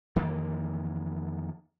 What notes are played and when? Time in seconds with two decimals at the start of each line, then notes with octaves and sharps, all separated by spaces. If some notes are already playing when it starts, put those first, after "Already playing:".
0.16 F2 D#3 E3 A#3